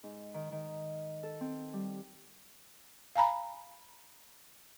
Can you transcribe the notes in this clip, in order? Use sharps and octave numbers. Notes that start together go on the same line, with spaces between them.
G#2
D#3
D#3
A4
C4
G3
F5 G#5 A#5 B5